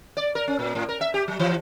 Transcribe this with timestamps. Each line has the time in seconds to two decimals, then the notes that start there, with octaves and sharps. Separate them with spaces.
0.17 D5
0.35 A#4
0.48 C#4
0.59 A#2
0.75 A2
0.89 A#4
1.01 E5
1.14 G4
1.28 F#3
1.39 E3